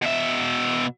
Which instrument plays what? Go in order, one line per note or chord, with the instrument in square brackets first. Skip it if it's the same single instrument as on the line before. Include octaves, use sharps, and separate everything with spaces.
[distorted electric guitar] B2 E5